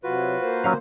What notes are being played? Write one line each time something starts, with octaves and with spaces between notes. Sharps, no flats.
C3 F#3 F4 F#4 B4
A#3 C5
F#3 C#4 F5